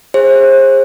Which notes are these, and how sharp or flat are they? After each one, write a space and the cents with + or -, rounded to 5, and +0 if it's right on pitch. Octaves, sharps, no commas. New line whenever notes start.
G#4 -30 C5 +30